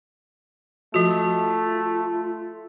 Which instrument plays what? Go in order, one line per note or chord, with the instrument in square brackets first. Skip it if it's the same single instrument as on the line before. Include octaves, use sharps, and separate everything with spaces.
[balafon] F3 F#4 [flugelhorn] A3 [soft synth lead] F4